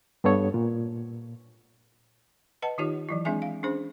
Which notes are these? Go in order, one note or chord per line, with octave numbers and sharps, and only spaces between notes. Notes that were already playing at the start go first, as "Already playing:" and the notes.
G2 B3 A4 C#5
A#2
B4 D#5 F#5 A5
D#3 D#4 F4 G4 C#5
E3 F#3 E4
G#3 C4 D4 G#4 E5 G#5
F5
C#4 D4 G#4 C5